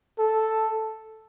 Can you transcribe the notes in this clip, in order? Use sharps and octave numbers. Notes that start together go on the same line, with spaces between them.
A4